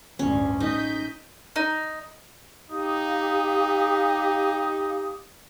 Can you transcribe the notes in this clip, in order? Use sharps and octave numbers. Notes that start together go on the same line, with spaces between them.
A1 D2 G2 C#4
D#4 D#5 G6 B6
D#4
D#4 G4 F5 D#6